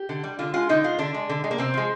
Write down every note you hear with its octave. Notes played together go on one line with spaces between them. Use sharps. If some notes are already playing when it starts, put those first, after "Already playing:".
Already playing: G4
D3
G3
D3 F4
G#3 F4
D3 D#4
G#3 F4
D3 D4
G#3
D3
G#3
A#3
C3 C4
F3 G#3